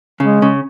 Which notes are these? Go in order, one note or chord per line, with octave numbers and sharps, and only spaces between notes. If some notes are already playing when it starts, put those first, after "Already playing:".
C#3 G#3
C#3